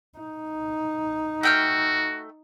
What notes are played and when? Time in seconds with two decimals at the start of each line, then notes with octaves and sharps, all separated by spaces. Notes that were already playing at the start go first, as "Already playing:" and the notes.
0.18 D#4
1.43 A3 F#4 G5 F6